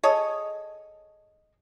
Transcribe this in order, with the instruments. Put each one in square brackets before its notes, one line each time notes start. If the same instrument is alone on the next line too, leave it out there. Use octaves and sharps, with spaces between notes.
[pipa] G#4 A4 C#5 D#5